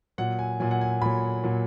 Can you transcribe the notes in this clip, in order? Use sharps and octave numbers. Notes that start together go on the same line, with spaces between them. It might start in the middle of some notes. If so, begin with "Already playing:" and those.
A#2 F#3 F#5
G#5
A#2 F#3 G#5
F#5
G#5
A#2 F#3 B5
A#2 F#3